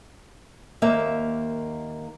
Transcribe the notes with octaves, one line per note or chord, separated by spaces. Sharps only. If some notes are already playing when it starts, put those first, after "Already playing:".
D#2 A#3 E5